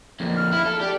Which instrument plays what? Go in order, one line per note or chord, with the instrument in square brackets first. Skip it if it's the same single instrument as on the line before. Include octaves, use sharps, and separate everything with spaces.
[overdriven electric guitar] F2 A#3
[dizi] F6
[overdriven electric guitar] E4
A4
[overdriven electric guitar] G4 [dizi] D5